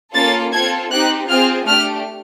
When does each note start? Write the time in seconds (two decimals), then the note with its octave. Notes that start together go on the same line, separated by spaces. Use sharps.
0.14 A#3 C#4 F4 A4 A6
0.52 C4 F4 A4 G#6
0.90 C4 D#4 G4 F#6
1.28 C4 F4 G#4 F6
1.67 A3 D4 G4 F6